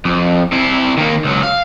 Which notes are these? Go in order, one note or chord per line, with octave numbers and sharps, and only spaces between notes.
F2
C3 E4
D#3 A#3
C#2 F#3
F5